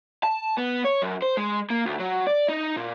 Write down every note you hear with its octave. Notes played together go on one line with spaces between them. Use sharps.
A5
B3
C#5
F#2
C5
G#3
A#3
D2
F#3
D5
D#4
A#2